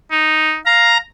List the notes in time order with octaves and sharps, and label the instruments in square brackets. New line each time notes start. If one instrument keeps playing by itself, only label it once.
[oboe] D#4
[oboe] F5 [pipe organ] A#5